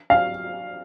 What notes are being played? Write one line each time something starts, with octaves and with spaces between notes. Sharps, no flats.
F5